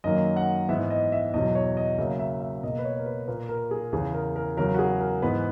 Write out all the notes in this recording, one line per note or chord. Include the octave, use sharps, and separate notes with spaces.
F#2 D#3 F#3 A#3 D#5
F#5
G#2 E3 B3 E5
D#5
E5
E2 B2 F#3 D#5
C#5
D#5
C#3 F#3 A#3 E5
E5
E5
B2 A#3 D#5
B4
C#5
A#4
B4
A#2 A#3 B4
A#4
G#4
E2 C#3 E3 B3 G#4
A#4
A#4
E2 C#3 F#3 A#4
F#4
G#4
A#4
G#2 E3 B3 B4